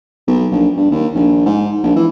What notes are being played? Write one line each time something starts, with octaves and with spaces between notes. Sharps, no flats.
B1
A#1
G2
D#2
A#1
G#2
A#1
E3